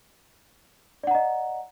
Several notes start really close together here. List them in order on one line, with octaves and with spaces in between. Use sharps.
D5 F#5 A#5 D#5